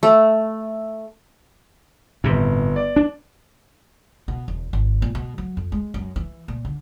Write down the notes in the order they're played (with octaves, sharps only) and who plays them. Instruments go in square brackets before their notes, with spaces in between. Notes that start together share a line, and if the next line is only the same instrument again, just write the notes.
[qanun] A3
[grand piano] G1 G3 [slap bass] A2 C3
[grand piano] D5
[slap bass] D4
[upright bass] B2
E1
G#1
A#2
B2
F#3
F2
G#3
F#2
E3
A#2
D3